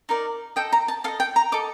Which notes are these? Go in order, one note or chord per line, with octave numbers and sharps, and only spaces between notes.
D#4 A#4 D5
A4 D#5 G5
A#5
A5
A4 D#5 F5
G5
A#5
A4 D#5 D6